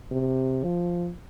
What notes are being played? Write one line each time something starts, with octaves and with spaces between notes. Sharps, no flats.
C3
F3